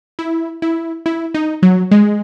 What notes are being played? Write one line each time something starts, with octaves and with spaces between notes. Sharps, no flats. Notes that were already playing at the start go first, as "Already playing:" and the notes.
E4
E4
E4
D#4
F#3
G#3